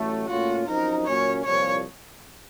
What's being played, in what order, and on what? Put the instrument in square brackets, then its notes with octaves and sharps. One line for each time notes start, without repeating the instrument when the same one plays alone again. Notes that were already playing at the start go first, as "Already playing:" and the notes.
Already playing: [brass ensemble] A1 A2 F#3 A3
[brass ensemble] A#2 A3 C#4 F4 [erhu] F#4
[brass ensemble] F#2 F3 C4 D#4 [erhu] A#4
[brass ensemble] A#2 F#3 A#3 C#4 [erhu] C#5
[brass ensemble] C2 A#2 F3 [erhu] C#5